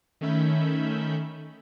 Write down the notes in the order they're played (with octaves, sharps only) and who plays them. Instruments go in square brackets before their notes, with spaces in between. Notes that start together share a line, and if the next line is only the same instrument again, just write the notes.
[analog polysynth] D#3 A3 C#4 E5 B5 G6